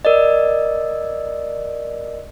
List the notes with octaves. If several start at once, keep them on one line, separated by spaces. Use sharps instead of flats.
A#4 D5 D#5